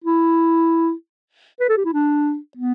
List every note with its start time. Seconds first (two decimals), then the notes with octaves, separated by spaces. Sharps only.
0.04 E4
1.60 B4
1.69 A4
1.77 G4
1.85 E4
1.93 D4
2.57 B3